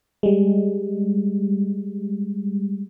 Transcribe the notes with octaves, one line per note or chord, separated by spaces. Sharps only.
G3 G#3